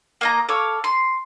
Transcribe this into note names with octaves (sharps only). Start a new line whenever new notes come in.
A#3 D#5 A#5
A4 C#5 F5 D6
C6